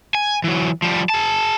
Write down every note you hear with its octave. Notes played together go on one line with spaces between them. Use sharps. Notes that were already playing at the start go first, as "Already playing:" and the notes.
G#5
E3 F#3
F3 G3
G#4 A5